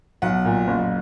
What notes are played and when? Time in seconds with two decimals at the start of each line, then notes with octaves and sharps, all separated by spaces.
0.22 B1 F#5
0.45 A#2
0.67 F#1